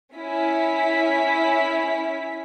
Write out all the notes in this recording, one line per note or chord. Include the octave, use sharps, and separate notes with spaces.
C#4 E4 B6